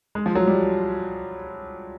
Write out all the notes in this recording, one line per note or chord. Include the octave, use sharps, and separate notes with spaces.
G#3
F3
F#3
G3